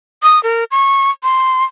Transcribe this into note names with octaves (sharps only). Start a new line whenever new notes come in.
D#6
A#4
C#6
C6